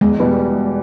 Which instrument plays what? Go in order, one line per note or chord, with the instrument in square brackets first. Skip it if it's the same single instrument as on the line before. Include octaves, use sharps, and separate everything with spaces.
[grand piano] E2 [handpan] G#3
[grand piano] B2 G3 B3